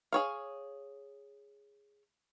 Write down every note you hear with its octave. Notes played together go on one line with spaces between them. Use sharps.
G#4 C#5 F5